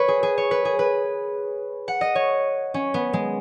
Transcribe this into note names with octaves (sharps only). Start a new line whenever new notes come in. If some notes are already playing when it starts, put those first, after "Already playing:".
Already playing: B4 C#5
G#4
G#4
C#5
B4
G#4
B4
F#5
D#5
C#5
C#4
B3
G#3